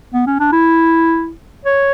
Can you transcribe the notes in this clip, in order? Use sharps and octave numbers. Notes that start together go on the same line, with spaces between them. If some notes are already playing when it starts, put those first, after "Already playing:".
B3
C#4
D4
E4
C#5